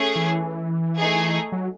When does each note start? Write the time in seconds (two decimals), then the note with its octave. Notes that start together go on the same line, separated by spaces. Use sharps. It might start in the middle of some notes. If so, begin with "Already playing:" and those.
Already playing: A3 C#4 G#4
0.16 E3
0.97 A3 D#4 G#4
1.52 F#3